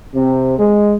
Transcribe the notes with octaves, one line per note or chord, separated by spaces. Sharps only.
C3
G#3